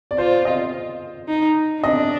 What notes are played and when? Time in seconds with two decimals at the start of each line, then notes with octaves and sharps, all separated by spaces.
0.11 D5
0.18 F4 C5
0.45 D#5
1.28 D#4
1.83 D4 D#5